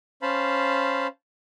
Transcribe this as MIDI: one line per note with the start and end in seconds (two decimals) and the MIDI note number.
0.22 1.07 61
0.22 1.07 72
0.22 1.07 77
0.22 1.07 81
0.22 1.07 83